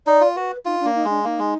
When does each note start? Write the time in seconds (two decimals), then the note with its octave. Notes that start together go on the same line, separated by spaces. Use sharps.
0.07 D#4 D5
0.21 F4
0.36 F#4 B4
0.65 D#4 F4
0.80 D4
0.85 A#3
0.95 D#4
1.04 G#3
1.10 D4
1.24 A#3 D#4
1.39 G#3